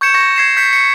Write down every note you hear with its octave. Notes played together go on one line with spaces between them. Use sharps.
C#6 G6 G#6 C#7 E7
C#6 A#6
G#6 C7 E7
G6 B6 C#7
C#7